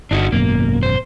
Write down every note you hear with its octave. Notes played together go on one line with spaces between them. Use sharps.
G1 D4 D#4 F#4
G#1 F#2 B2 A#3
C5